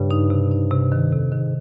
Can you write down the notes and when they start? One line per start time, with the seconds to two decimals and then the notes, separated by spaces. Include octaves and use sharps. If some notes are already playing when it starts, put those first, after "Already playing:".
Already playing: G2 C#3
0.11 D#4
0.30 C3
0.51 D#4
0.71 C3
0.92 D#3
1.12 F2 C3
1.32 G#2 D#3